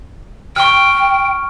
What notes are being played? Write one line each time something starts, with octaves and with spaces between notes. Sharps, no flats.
G5 C#6 F6